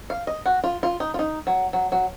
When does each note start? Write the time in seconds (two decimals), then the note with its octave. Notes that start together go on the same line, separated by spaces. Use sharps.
0.10 F5
0.27 D#5
0.46 F#4
0.64 F4
0.83 F4
1.00 D#4
1.14 F4
1.19 D#4
1.47 F#3
1.73 F#3
1.92 F#3